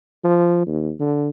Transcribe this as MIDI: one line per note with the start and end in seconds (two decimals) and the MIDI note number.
0.24 0.62 53
0.67 0.92 39
1.00 1.29 50